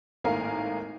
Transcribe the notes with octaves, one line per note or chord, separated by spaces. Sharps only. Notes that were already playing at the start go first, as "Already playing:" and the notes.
G#1 A2 A#3 A#4 F5 G#5